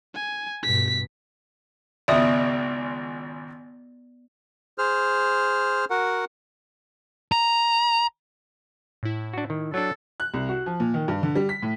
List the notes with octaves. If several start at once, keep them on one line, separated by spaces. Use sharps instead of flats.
G#5
G2 B2 B6
G#1 C#2 B3 D5 E5 D#6
G#4 C5 F6
F#4 A#4 F#5
A#5
A2 E4
D4 F#4
D#3
F#3 D4 A4
F#6
C2
F#4
F3
A#2
D#3
G2
D3
G3
B6
A2